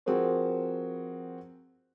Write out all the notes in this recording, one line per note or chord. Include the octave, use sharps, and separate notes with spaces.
F3 C4 F#4 G#4 A#4 C5